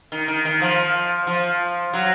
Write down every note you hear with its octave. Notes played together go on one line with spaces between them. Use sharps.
D#3
D#3
D#3
F3
F3
F#3